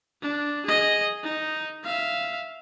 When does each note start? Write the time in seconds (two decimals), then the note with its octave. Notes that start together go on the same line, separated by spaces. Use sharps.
0.22 D4
0.66 G#4 D#5
1.23 D#4
1.84 E5 F5